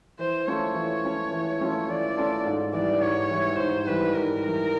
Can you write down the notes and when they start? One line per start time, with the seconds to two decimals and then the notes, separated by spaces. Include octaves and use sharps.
0.19 E3 C5
0.47 A3 C#4 F4 A4 C#5
0.75 E3
1.04 A3 C#4 F4 A4
1.32 E3
1.61 A3 C#4 F4 A4
1.89 E3 D5
2.17 A3 C#4 F4 A4
2.46 G#2
2.73 E3 G3 D5
3.01 G#2 C#5
3.30 E3 G3
3.58 G#2 C5
3.87 E3 G3 B4
4.15 G#2 A#4
4.43 E3 G3